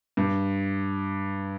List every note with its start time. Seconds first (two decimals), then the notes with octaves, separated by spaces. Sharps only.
0.17 G2